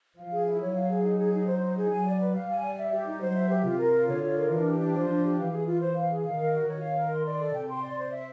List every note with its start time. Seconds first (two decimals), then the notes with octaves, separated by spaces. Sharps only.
0.17 F3 F5
0.31 G#4
0.46 E4
0.60 F#3 C#5
0.75 F5
0.89 G#4
1.04 D#4
1.19 G#4
1.33 D#4
1.47 C5
1.61 D#4
1.77 G#4
1.90 F#3 G#5
2.05 D5
2.19 B4
2.34 G3 F5
2.48 G#5
2.62 D5
2.78 E5
2.92 G4
3.06 D#4
3.20 F#3 C5
3.35 E5
3.49 G4
3.64 C3 F4
3.79 A#4
3.93 F4
4.08 D3 C#5
4.22 F4
4.37 A#4
4.50 E3 D4
4.66 G4
4.80 D4
4.94 F3 C5
5.09 D4
5.24 G4
5.38 E3 F5
5.52 G#4
5.66 F4
5.81 C5
5.95 F5
6.09 G#4
6.24 D#3 F5
6.39 A#4
6.53 F#4
6.67 D#3 C#5
6.81 F5
6.97 A#4
7.11 C6
7.25 D5
7.40 A4
7.54 C3 G5
7.69 C6
7.83 D5
7.98 C5
8.12 E5